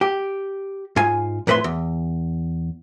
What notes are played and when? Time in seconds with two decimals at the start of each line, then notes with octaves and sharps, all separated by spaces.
0.01 G4
0.96 G#2 F4 G#5
1.47 F2 A2 B4 E5 C6
1.64 E2